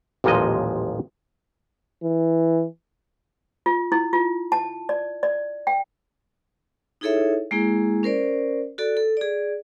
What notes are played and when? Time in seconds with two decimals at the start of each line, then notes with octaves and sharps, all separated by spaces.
0.24 A1 D#2 A#2 F3 G#3 D#5
2.03 E3
3.66 F4
3.92 E4
4.13 F4
4.52 A5
4.89 D5
5.23 D5
5.67 G5
7.01 D#4 E4 G#4 A4 C#5 E5
7.51 G#3 A#3 E4 G#4
8.03 C#4 A#4 C5 D5
8.78 F#4 A4 D5
8.97 A4
9.17 G#4 D5